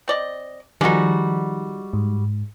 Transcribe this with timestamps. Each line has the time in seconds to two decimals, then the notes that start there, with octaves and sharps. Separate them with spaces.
0.08 C4 D5 D#5
0.81 D#3 F3 G3 G#3 D#4 F#4
1.93 G#2